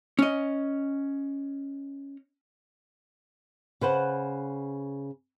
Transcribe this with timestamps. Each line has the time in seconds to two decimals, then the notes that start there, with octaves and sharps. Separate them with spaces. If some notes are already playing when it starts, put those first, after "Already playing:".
0.19 C#4 D#5
3.81 C#3 B4 C5 F#5